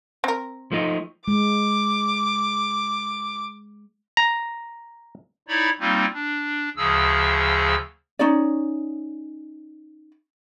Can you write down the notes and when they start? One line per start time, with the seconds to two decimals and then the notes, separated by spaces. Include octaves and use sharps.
0.24 C4 A#4
0.72 F3 A3 D#4
1.28 G#3 D6
4.17 A#5
5.48 D#4 E4 C#5 D5 B5
5.80 G3 A#3 C4 D#4 F4
6.13 D4
6.77 D2 C#3 F3 G#4 E6
8.19 C#4 D#4 C#5 D5